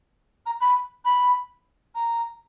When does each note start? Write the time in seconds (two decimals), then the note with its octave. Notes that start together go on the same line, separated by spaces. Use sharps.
0.46 A#5
0.61 B5
1.05 B5
1.95 A#5